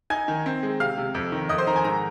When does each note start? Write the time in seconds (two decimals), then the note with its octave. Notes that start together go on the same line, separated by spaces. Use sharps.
0.10 D#4 G#5 G#6
0.28 D#3
0.46 C4
0.63 G#3
0.80 C3 F5 F6
0.97 C3
1.15 F2
1.32 D#3
1.49 F2 D#5 D#6
1.58 C5 C6
1.67 D#3 A#5
1.76 G#5
1.84 G#2 A#5